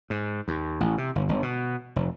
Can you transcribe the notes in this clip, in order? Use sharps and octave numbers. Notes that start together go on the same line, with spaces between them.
G#2
D#2
A1
C3
G1
G1
B2
F1